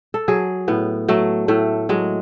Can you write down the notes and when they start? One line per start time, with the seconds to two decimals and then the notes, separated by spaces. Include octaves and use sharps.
0.14 A4
0.28 F#3 G#4
0.68 A2 B3
1.08 F#3 A3
1.48 A2 A3
1.89 F#3 G#3